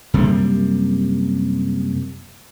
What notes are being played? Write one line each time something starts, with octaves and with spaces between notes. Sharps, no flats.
F#2 C3 G3 A#3